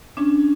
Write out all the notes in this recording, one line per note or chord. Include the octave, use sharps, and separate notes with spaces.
C#4 D4